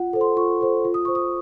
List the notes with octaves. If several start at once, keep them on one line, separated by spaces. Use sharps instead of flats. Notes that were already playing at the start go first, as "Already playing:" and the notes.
Already playing: F4 F#5
A4 C5
C6
F4 C#6
A4 C5
F4
D#6
C5 C#6
D#6